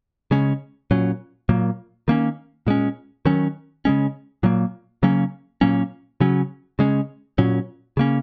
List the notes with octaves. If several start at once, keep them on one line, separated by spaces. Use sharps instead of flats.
C#3 G#3 C#4
A#2 F#3 C#4
A#2 F#3 A#3
D#3 A#3 C#4
A#2 G#3 C#4
D#3 F#3 C#4
C#3 G#3 C#4
A#2 F#3 A#3
C#3 F#3 A#3 C#4
A#2 F#3 A#3 C#4
C#3 F#3 C#4
C#3 G#3 C#4
A#2 F#3 C#4
C#3 A#3 C#4